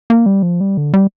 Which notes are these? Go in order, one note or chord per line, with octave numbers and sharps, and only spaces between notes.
A#3
G3
F3
G3
D3
G3